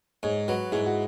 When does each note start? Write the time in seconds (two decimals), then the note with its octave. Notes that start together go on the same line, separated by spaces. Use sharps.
0.23 G#2 G#4 C#5
0.48 F#3 F#4 B4
0.72 G#2 E4 G#4
0.86 F#4